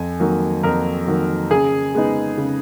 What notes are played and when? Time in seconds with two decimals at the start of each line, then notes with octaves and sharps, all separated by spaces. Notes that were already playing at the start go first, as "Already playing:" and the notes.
Already playing: F2 G#5
0.20 D#3 F#3 A#3
0.63 F2 A#4
1.07 D#3 F#3 A#3
1.51 C#3 G#4
1.95 G#3 B3 D#4
2.38 C#3